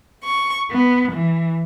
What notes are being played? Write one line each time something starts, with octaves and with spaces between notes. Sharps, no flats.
C#6
B3
E3